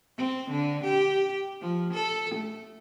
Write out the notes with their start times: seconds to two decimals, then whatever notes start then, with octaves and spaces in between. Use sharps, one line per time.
0.17 C4
0.50 D3
0.84 G4
1.61 F3
1.93 A4
2.35 A3